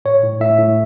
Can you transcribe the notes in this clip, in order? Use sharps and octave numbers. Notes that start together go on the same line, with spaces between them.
A2 C#5
A2
A2 E5
A2